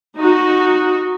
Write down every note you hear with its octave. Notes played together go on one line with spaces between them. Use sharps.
D#4 F#4